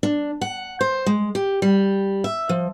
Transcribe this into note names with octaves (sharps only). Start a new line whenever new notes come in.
D4
F#5
C5
G#3
G4
G3
E5
F3